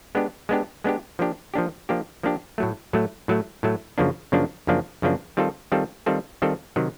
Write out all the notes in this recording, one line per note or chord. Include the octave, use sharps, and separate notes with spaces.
G#3 B3 D4 G4
G#3 B3 D4 G4
G#3 B3 D4 G4
F3 A#3 D4 G4
F3 A#3 D4 G4
F3 A#3 D4 G4
F3 A#3 D4 G4
A2 F#3 A3
A2 F#3 A3
A2 F#3 A3
A2 F#3 A3
F#2 C#3 F3 A#3 D4
F#2 C#3 F3 A#3 D4
F#2 C#3 F3 A#3 D4
F#2 C#3 F3 A#3 D4
D#3 G3 C4 F4 A4
D#3 G3 C4 F4 A4
D#3 G3 C4 F4 A4
D#3 G3 C4 F4 A4
C3 D#3 F#3